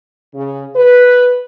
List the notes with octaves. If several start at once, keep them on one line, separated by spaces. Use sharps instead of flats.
C#3
B4